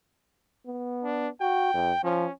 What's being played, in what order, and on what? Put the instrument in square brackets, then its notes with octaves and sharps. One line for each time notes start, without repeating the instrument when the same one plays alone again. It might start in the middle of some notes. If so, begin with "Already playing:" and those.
[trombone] B3
[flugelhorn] D4
[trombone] F#4 [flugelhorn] G5
[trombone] F2
[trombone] F3 [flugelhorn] C#4